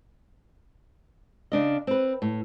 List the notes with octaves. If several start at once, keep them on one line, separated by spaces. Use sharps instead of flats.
C#3 D4 D#5
C4 B4
A2